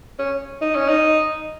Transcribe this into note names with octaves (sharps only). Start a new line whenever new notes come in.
C#4
D#4
C#4
D#4